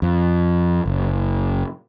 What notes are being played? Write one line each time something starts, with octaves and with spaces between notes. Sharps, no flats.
F2
F#1